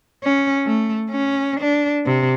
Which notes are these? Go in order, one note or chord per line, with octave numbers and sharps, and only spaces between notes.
C#4
A3
C#4
D4
C3